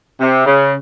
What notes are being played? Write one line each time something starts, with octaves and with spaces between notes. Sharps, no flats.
C3
C#3